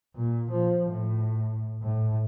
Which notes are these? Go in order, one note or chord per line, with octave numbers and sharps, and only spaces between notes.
A#2
F3
A2
A2